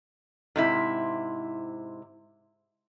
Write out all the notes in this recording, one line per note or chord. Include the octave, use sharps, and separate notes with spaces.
G#2 C3 E4